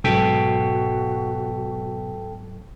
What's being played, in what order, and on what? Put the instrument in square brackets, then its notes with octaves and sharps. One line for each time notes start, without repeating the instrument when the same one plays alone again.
[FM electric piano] G#2 F#3 [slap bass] B2 [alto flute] F#4 [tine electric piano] A4 G5 B6